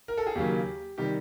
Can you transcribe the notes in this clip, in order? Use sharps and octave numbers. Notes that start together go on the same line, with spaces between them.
A#4
A4
G#4
D#2 C#3 F#3 A#3 G4
C3 D#3 G3 G4